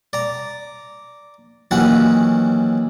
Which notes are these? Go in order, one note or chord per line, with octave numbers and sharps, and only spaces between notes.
D5 A#5
D#2 E3 F#3 C#4 F#5